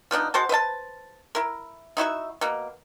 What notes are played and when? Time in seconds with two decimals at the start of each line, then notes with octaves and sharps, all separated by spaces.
0.11 F3 B3 D4 D#4
0.34 G#3 F#4 C5 A5
0.49 B4 C5 E5 A5
1.35 E4 A#4
1.97 D#4 E4 F#4 E5
2.41 B2 A#3